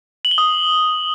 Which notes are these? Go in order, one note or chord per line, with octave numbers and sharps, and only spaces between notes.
F#7
G7
D#6